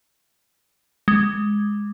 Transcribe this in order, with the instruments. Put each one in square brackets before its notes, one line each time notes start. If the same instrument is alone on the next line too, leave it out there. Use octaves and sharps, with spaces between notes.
[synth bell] G#3